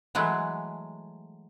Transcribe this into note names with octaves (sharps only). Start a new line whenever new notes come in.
E3 F#3 G#3 A3